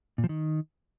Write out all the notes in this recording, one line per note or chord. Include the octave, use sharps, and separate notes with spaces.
A#2
F3
D#3